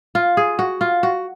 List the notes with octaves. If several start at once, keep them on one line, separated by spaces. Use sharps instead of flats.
F4
G#4
F#4
F4
F#4